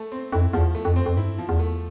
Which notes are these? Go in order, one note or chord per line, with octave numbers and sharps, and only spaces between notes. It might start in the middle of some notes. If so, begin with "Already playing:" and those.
Already playing: A3
C4
F2 E4
E2 F3
A3
F2
C4
F2
G2 E4
F3
E2
A3